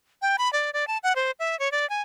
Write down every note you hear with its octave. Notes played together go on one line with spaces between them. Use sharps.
G5
B5
D5
D5
A5
F#5
C5
E5
C#5
D5
G#5